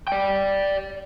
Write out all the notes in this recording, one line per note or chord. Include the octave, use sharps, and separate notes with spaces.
D5 G5